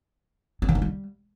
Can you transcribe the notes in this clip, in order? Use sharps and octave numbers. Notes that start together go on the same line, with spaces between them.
C4
E3
D#4
G3